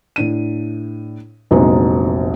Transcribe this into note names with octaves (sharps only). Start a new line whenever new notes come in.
A2 D4 D#7
F1 A#1 F#3 G#3 B3 D#4